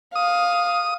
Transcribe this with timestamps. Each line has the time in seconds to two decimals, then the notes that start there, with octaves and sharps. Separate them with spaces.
0.15 F5 D#6